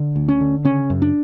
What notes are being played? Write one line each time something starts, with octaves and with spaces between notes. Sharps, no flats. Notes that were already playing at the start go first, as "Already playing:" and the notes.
Already playing: D3
D2
C#4
D3
C#3 C#4
F#2
D4